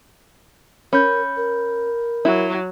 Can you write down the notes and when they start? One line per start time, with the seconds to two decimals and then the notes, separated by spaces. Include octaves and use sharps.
0.93 C#4 A#4 B5 G6
1.37 A#4
2.25 F#3 E4